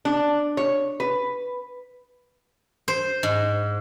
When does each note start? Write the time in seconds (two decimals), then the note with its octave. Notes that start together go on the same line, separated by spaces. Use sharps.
0.05 D4
0.57 C#5
1.00 B4
2.88 C5
3.23 G#2